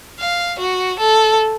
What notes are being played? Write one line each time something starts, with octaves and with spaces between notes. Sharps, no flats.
F5
F#4
A4